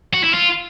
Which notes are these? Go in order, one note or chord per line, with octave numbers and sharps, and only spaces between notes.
F#4
E4
F4